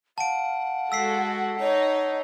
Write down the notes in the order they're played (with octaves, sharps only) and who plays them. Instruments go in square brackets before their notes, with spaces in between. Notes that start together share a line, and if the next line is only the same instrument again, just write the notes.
[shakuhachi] F5 [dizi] F#5 [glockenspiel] A5 D7
[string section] G#3 F#4 A4 [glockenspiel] E6 B6 C7
[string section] D#4 [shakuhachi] C#5